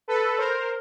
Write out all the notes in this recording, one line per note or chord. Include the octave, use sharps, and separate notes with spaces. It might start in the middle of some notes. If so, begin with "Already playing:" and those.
A4 B4
A#4 C5